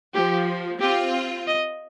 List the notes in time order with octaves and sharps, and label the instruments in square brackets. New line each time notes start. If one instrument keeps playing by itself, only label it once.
[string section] F3 [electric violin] G4
[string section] C4 F4 [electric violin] G4
[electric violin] D#5